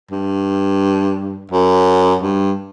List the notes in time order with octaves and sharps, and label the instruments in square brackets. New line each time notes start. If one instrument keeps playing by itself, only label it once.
[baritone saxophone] G2
F#2
G2